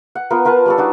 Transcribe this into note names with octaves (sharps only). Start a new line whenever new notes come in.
F#5
B3 F4 A#4
F4 A#4 B4 A5
G3 C#4 A4
D4 D#4 F#4